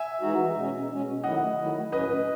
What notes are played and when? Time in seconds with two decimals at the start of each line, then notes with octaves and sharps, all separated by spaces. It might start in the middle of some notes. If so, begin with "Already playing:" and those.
Already playing: E5 G#5
0.21 E3 G#3 D#4 F#4
0.55 B2 G#3 C#4
0.90 B2 G#3 C#4
1.24 D#3 F#3 A3 E4 D#5 F#5
1.58 D#3 F#3 A3 E4
1.92 A2 F#3 C#4 B4 D#5